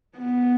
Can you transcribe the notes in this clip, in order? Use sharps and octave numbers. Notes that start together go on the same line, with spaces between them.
B3